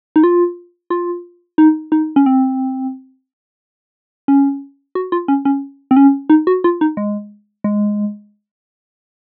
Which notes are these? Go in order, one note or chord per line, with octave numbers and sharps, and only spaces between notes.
D#4
F4
F4
D#4
D#4
C#4
C4
C#4
F#4
F4
C#4
C#4
C4
C#4
D#4
F#4
F4
D#4
G#3
G#3